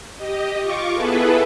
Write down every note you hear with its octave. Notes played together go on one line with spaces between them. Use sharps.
G4 D#5
F4 C#6 D6
B3 E4 G#4 A4 B4